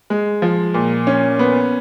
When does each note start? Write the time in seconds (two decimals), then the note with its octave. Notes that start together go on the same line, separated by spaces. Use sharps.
0.10 G#3
0.42 F3
0.74 A#2
1.07 C#4
1.39 B3